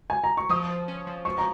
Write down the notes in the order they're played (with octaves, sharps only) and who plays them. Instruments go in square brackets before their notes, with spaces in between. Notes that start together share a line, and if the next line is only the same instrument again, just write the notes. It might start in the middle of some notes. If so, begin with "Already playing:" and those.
[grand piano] G#5
A#5
C#6
[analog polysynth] F3 [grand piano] D#6
[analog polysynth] F3
C#4
F3
[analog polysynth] F3 [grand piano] C#6
[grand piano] A#5